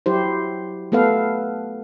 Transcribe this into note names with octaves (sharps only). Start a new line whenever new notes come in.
F#3 E4 G4 C5
A3 B3 A4 B4 F5